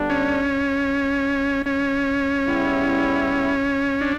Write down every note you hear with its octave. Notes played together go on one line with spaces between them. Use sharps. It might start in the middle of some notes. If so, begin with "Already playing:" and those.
Already playing: D3 G3 B3 D4
C#4
C#4
C#3 G3 B3 E4 G4
D4